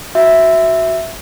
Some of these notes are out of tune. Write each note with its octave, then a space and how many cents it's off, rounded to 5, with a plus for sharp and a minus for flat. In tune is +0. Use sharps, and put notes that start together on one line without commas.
F#4 +0 E5 +0